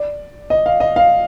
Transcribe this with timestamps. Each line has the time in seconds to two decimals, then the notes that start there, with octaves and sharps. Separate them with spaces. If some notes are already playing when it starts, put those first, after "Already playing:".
Already playing: D5
0.50 D#5
0.66 F5
0.80 D#5
0.96 F5